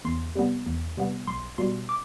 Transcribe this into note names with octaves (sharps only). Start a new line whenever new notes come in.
E2 C6
C3 G3 B3
E2
C3 G3 B3
B1 C6
B2 G3 C6
D6